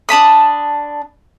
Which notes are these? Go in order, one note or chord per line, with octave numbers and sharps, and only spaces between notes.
D4 A5 B5 D#6